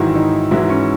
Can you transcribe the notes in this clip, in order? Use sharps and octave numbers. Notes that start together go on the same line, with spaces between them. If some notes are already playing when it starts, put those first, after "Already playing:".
Already playing: G#2 D#3 E3 F#3 E4
D#4
G#2 E3 F#3 E4
C#4